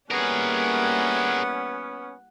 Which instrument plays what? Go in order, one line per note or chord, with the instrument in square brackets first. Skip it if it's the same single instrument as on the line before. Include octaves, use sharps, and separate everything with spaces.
[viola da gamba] G3 A#3 E4 [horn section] B3 C#4 [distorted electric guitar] G#4 A#4 [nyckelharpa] F#5